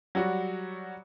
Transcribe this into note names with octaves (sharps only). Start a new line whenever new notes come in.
F#3 G3 F#4